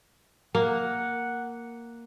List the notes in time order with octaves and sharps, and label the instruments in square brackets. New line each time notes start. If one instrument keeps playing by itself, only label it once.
[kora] A#3 [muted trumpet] F#5